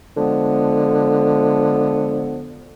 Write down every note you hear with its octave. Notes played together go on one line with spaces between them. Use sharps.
D3 F3 G#3 B3